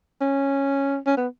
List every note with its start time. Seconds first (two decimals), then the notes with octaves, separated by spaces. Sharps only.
0.21 C#4
1.06 C#4
1.17 B3